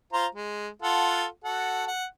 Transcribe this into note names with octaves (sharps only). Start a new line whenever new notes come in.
F4 C5 A#5
G#3
F4 A4 F#5
F#4 A4 F#5
F#5